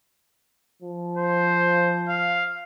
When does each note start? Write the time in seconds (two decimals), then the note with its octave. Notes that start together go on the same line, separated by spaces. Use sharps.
0.82 F3
1.17 C5
2.09 F5